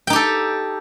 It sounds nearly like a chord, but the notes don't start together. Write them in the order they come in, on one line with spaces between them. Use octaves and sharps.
G5 D#4 G4 A4